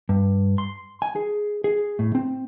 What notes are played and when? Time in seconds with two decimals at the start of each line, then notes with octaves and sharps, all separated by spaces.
0.09 G2
0.58 C6
1.02 G#5
1.16 G#4
1.64 G#4
1.99 A2
2.15 C4